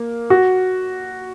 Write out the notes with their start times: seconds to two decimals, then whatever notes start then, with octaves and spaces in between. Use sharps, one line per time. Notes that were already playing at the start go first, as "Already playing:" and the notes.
Already playing: A#3
0.30 F#4